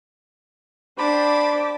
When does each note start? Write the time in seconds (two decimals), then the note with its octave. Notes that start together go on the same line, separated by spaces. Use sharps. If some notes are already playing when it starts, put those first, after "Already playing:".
0.98 D4 G4 C5 A5 B5 D6